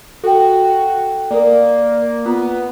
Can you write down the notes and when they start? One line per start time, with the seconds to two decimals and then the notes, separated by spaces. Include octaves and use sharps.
0.24 F#4 A4 G5
1.31 A#3 A#4 D5
2.26 B3 F4